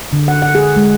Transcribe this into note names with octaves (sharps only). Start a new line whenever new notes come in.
D3
F#5
F#5
G#4
G#3